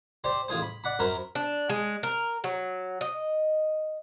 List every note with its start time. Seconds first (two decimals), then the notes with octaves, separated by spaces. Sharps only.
0.24 G4 C5 D5 C6
0.48 A1 F4 G#4 C5
0.62 B5
0.84 D5 F#5 B5
0.99 F#2 A#4 C5 B5
1.35 D4
1.70 G#3
2.03 A#4
2.44 F#3
3.01 D#5